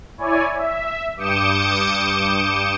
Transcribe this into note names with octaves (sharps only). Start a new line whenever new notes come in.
E4 C#5 D5 G#5
E5
G2 D6 D#6 G6 C#7 E7